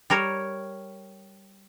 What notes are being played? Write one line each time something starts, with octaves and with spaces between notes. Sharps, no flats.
G3 A#4 C#5